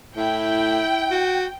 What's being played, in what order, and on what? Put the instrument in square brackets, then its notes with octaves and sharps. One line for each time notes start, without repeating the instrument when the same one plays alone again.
[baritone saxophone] A2 [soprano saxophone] E4 [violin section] G5
[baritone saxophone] F#4